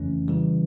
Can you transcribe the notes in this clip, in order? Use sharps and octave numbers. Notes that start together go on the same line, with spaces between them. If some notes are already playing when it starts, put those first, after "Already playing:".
Already playing: F2 C#3 E3 A3 C#4
C#3 E3 G3